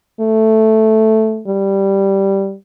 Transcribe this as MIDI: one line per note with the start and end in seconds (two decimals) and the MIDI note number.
0.20 1.43 57
1.48 2.55 55